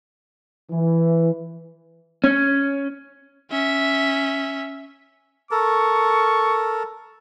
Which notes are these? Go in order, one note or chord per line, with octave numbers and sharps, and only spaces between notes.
E3
C#4
C#4 E5
A4 A#4 C#6